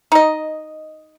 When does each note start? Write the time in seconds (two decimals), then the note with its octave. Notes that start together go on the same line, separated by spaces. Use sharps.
0.12 D#4 D#5